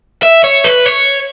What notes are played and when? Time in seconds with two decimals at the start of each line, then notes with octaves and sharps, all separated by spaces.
0.23 E5
0.44 C#5
0.64 B4
0.86 C#5